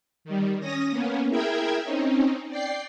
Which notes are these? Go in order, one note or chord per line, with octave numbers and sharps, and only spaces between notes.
D#3 G3
C#4 D#6 A#6
A#3 B3 C#4
E4 G#4 A#4 E5 G5 G#5
C4 C#4 D#4
D5 G5 C7